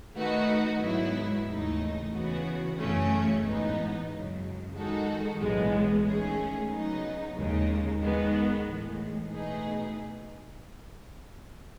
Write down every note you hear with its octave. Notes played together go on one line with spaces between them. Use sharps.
D#3 A3 D#4 F#4 B4
G#2 F#3 B3 E4
D#2 C#3 E3 A3 D#4
C#3 E3 B3 F#4
F#2 C#3 E3 A3 C#4
A1 G#2 E3 B3 D#4
F#2 C#3 F#3
D#3 G#3 D#4 F#4 A4
B1 A2 E3 G#3 B3
D#3 A3 C#4 G#4
C#3 F#3 B3 D#4
D#2 C#3 G#3 D#4
D#3 G#3 B3
A2 E3 G#3
B2 A3 D#4 G#4 B4